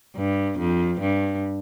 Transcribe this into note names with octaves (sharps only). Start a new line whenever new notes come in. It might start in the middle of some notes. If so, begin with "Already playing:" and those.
G2
F2
G2